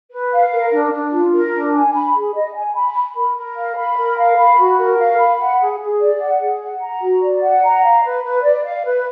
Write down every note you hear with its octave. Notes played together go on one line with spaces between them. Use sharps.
B4
F5
A#4
D4
D4
F4
A#4
D4
G#5
B5
G#4
D#5
G#5
B5
B5
A#4
A#4
F5
B5
A#4
F5
B5
F#4
A#4
F5
B5
F#5
G#4
G#4
D5
F#5
G#4
F#5
A#5
F#4
D5
F#5
A#5
F5
B4
B4
D5
F5
B4